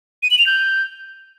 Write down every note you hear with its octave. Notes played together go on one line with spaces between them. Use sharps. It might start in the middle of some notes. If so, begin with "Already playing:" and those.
D#7
F#7
F7
G6